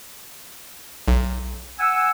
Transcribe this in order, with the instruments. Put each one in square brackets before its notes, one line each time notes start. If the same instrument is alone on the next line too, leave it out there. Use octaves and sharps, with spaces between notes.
[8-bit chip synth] B1
[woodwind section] F#5 G#5 E6